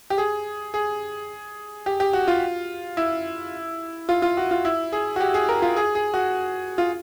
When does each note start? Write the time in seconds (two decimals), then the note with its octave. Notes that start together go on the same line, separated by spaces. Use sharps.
0.10 G4
0.18 G#4
0.74 G#4
1.86 G4
2.00 G4
2.13 F#4
2.28 F4
2.97 E4
4.09 F4
4.22 F4
4.37 F#4
4.51 F4
4.65 E4
4.93 G#4
5.16 F#4
5.20 G4
5.34 G#4
5.49 A#4
5.62 F4
5.76 G#4
5.95 G#4
6.14 F#4
6.78 F4